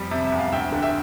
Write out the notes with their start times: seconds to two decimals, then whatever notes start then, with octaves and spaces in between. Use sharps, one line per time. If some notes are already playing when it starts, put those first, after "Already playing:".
Already playing: F2 G3
0.11 C3
0.26 E5
0.32 E2
0.39 F5
0.52 D2 E5 G5
0.72 D3
0.82 E5 G5